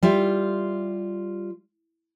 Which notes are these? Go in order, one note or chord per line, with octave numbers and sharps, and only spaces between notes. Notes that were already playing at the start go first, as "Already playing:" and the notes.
G3 F4 E5